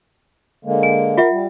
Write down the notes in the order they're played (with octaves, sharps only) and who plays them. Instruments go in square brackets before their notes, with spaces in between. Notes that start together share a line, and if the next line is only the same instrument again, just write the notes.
[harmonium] D3 G#3 A#3
[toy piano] G#5
[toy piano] F4 E5 F#5 [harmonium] A#4
[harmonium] G3